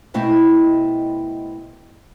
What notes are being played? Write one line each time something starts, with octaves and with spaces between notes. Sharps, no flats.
B2 A3 C4 E4 D#5 G5